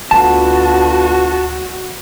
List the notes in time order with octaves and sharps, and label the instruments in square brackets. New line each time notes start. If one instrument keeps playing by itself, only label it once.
[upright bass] D2 [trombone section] D3 B3 F4 [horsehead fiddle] F#4 [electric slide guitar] A5